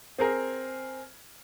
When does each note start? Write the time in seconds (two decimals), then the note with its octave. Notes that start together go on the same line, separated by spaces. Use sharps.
0.18 C4 G#4 A#4